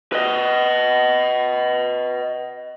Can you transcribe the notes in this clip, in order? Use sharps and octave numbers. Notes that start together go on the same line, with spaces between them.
B4 D#5